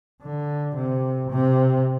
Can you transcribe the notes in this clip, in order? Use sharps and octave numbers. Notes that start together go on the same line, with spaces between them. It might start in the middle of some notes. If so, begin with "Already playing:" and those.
D3
C3
C3